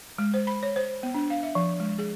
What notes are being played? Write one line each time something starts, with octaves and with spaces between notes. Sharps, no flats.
G#3
C5
B5
C#5
C5
B3
D4
F5
E5
F3
G#3
G#4